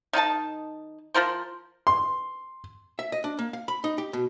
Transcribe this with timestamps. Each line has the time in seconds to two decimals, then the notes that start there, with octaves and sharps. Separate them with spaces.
0.13 D#3 D#4 G4 A5
1.14 F3 F4 A#4 C5
1.87 C6
2.99 E5
3.12 D#5
3.24 D4
3.39 A#3
3.53 F5
3.68 B5
3.84 D#4
3.98 G4
4.13 B2